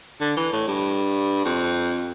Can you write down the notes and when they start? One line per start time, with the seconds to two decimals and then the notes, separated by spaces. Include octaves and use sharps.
0.21 D3
0.37 E3
0.52 A2
0.68 G2
1.45 F2